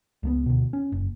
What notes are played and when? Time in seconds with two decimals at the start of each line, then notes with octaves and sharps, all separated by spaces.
0.23 C#2 A3 B3
0.46 D2 B2
0.73 C#4
0.92 F#1